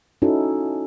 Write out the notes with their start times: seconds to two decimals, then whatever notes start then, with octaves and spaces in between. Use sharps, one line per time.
0.22 C#4 D#4 E4 F#4 A4